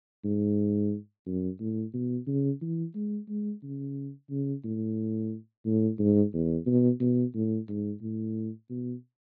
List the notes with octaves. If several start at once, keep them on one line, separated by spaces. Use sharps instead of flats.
G#2
F#2
A2
B2
C#3
E3
G#3
G#3
C#3
C#3
A2
A2
G#2
E2
B2
B2
A2
G#2
A2
B2